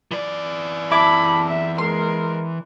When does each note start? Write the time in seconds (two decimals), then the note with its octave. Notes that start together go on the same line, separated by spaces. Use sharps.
0.11 E3 D5
0.92 E4 A5 B5 D6
1.48 E5
1.78 G#3 A#4 C6